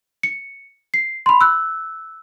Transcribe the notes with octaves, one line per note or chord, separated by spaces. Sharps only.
C#7
C7
B5 C6
E6 F#6